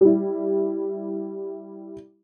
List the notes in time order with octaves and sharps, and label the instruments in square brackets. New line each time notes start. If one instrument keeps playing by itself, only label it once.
[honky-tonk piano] G3 E4